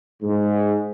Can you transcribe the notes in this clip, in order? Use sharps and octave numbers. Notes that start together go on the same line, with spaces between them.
G#2